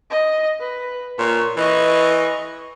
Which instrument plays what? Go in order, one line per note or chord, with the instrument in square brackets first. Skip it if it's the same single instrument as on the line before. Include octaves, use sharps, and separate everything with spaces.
[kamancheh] D#5
B4
[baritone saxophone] A#2 [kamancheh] C#5
[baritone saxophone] E3 [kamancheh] D#5 C#6